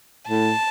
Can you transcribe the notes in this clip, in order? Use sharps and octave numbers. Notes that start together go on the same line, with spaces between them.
A2 A5